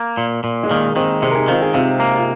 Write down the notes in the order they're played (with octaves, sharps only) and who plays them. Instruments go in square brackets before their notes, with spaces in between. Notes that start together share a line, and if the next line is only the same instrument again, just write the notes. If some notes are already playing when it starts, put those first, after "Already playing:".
Already playing: [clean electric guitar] A#3
A#2
A#2
[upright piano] G#3
[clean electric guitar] D#3 [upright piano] A#3
[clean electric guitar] D#3 [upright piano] G#3 C4
[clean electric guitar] C3 [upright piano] G#3 C4
[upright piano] A#4
D#4 G#4
[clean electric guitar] D#3 [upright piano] C4 F4
[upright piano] D#4 G#4
[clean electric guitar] C3 [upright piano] C4 F4
[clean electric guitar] A#3
[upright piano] F4